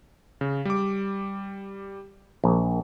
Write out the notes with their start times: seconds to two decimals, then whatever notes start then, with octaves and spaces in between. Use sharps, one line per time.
0.41 C#3
0.65 G3 D6
2.44 A#1